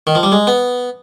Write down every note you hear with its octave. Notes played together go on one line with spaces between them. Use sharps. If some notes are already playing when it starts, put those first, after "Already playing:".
D#3
F3
G3
G#3
B3